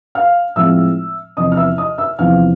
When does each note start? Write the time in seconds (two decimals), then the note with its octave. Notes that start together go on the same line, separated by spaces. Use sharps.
0.15 F5 F6
0.56 A2 F3 G#3 C4 E5 E6
1.37 E2 C3 F3 D#5 D#6
1.52 F6
1.57 E5 E6
1.78 D#5 D#6
1.98 E5 E6
2.19 E2 C3 F3 F5 F6